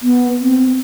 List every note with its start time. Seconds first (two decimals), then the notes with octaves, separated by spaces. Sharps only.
0.03 B3
0.40 C4